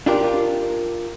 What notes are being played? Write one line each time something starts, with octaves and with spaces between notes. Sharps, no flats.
D4 F4 G4 A#4